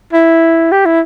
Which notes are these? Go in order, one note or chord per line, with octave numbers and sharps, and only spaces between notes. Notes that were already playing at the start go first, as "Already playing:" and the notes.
E4
G4
E4